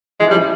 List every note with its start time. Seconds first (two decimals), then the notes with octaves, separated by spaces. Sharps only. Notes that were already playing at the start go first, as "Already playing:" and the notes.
0.20 E3 G#3
0.27 F3
0.31 G3
0.36 E3